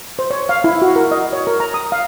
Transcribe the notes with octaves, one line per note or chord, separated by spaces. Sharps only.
C5
C#5
F5
E4
F#4
A#4
D#5
C#5
A#4
A#5
D#6
F5